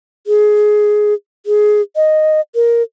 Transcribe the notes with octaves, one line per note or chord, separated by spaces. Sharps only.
G#4
G#4
D#5
A#4